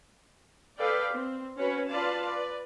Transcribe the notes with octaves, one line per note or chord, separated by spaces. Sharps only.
A4 B4 D5 F5 G5
C4
C#4 F#4 B4 C#5
F4 B4 D5 F5 A5
B4 D5